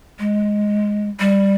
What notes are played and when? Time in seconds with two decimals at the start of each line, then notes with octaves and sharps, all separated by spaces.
0.19 G#3
1.20 G3